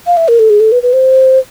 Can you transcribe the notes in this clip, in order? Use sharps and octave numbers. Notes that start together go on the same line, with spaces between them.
F5
E5
A#4
A4
G#4
A4
B4
B4
C5